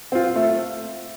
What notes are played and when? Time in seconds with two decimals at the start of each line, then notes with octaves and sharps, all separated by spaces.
0.12 C4 F4
0.36 A3